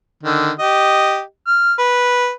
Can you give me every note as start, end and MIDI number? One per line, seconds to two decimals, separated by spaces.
0.23 0.51 50
0.23 0.51 51
0.60 1.21 67
0.60 1.21 75
1.47 1.74 89
1.79 2.30 71